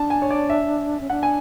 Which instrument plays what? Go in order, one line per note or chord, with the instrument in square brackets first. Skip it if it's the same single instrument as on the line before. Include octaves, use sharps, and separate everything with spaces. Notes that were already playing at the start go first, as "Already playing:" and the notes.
Already playing: [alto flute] D4 [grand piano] A5
[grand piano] G#5
C#5
D5
E5
[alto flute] C#4
[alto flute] D4 [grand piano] F#5
[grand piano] G#5